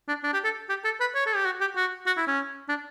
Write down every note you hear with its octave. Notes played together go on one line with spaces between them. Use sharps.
D4
D4
G4
A4
G4
A4
B4
C#5
A4
G4
F#4
G4
F#4
F#4
E4
C#4
D4